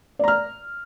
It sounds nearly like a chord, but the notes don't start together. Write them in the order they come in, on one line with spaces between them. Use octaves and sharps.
D5 A#5 F6